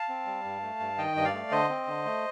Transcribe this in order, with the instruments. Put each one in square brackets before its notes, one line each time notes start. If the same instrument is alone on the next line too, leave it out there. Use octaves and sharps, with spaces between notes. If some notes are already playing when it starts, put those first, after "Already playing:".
Already playing: [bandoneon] F5 A5
C4
G3
G2
A3
G2
D#3 D#5 G5
G2 D#5
D5 F5
A3
D3 C5 D#5
C4
D3
A3